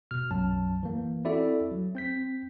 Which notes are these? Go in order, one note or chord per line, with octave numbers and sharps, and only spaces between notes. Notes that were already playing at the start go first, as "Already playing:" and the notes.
B2 F6
B1 F#2 F#3 A5
E3 A#3
C4 E4 F#4 A4 D5 E5
F#3
C4 G6 B6